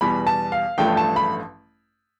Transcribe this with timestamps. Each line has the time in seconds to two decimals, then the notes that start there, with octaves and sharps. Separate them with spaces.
0.01 E2 B2 G3 B5
0.27 A5
0.52 F5
0.78 A1 G2 F3 A3 G5
0.97 A5
1.16 B5